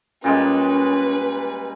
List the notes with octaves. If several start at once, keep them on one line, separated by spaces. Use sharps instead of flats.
A#2 G3 G#3 C#4 B4